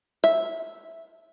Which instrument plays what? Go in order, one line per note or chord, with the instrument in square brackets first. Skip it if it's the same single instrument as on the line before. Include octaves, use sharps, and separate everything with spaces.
[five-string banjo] E5